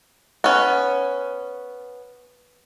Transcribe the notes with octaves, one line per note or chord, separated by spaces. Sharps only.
B3 C#4